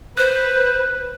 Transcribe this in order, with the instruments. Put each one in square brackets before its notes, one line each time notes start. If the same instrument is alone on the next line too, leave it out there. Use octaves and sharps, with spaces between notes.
[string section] B4 [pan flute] C5 [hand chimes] F#6